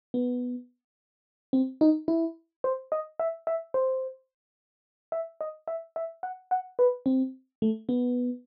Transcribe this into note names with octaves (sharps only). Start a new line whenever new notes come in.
B3
C4
D#4
E4
C5
D#5
E5
E5
C5
E5
D#5
E5
E5
F#5
F#5
B4
C4
A3
B3